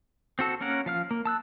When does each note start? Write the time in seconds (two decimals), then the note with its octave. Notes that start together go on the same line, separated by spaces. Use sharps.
0.39 C4 F#4 A4
0.61 A#3 C#4 A#4 F#5
0.86 F3 F5 F6
1.11 A#3
1.25 A5 E6 F#6